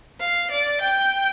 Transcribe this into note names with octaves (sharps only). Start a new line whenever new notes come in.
F5
D5
G5